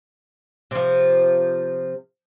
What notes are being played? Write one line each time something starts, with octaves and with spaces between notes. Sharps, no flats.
C3 F3